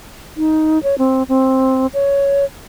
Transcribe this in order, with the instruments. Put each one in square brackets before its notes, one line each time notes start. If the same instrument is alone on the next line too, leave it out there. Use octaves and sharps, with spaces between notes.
[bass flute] D#4
C#5
C4
C4
C#5